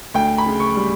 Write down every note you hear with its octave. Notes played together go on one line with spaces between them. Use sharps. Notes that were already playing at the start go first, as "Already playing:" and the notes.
D2 G5
B5
C#3
C#6
G3